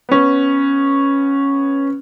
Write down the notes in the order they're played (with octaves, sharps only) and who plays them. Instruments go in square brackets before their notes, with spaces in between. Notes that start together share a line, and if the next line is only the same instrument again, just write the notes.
[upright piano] B3 C#4